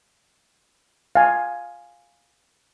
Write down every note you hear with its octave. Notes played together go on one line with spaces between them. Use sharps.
F5 G#5